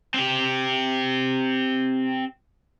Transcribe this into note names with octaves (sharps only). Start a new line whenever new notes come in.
C4 G4